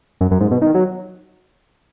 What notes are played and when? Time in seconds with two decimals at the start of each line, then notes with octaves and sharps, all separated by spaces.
0.21 F#2
0.31 F#2
0.41 G#2
0.51 B2
0.62 D#3
0.74 F#3